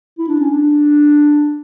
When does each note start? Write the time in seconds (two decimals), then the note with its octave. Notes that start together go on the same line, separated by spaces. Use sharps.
0.18 E4
0.29 D4
0.40 C#4
0.51 D4